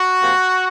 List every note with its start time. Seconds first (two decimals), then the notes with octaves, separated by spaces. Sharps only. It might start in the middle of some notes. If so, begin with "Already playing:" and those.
Already playing: F#4
0.22 C3 F3 A#3